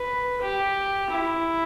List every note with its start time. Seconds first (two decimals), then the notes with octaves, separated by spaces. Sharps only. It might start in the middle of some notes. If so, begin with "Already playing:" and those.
Already playing: B4
0.41 G4
1.10 E4